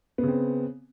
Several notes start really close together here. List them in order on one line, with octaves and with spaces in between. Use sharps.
B3 C#3 C4